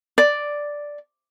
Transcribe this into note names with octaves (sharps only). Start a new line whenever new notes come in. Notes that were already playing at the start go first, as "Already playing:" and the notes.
D5